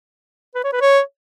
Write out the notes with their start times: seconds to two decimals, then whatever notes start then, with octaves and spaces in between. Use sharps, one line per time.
0.55 B4
0.64 C#5
0.72 B4
0.81 C#5